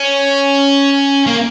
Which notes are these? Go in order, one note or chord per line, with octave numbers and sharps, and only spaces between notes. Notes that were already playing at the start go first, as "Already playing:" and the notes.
Already playing: C#4
A#3